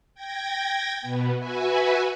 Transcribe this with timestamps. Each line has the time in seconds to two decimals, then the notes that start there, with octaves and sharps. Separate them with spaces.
0.14 G5 G#6 A#6
1.01 B2 B3
1.37 F#4 B4 E5 G#5